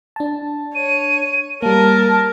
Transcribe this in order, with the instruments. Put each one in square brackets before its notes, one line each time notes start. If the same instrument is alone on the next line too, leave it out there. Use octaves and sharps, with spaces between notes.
[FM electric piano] D4 A5
[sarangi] C#5 [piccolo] D#7
[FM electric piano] G3 A#3 [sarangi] A#4 [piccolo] A5